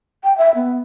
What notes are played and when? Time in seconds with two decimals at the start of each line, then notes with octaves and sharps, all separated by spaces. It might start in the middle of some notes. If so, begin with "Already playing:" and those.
0.24 G5
0.38 E5
0.55 B3